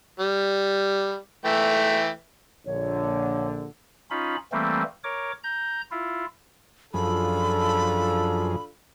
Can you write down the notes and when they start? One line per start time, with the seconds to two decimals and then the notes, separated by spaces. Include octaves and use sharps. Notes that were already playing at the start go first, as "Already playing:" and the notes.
0.20 G3
1.45 E3 A3 G5
2.66 A#1 D3 C#5
4.11 C#4 D#4 F4 B5
4.52 E3 G3 A3 A#3 C4
5.04 A#4 C#5 D6
5.44 A#5 G6
5.91 E4 F4
6.94 F#2 F3 D4 F4 G#4 A4 B5